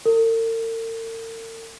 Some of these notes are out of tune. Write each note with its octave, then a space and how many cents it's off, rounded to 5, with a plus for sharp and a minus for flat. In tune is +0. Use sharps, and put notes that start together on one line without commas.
A#4 -45